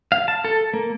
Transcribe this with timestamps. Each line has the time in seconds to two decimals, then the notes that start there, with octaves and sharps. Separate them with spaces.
0.12 F5
0.28 A5
0.45 A4
0.74 A#3